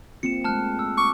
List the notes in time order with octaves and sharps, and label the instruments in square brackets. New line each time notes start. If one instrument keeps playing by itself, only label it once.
[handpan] A#3 C4 F4 [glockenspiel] C#7 E7
[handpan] G#3 A3 [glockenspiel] A5 F6 F#6
[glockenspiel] E6
[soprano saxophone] C#6 [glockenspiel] D6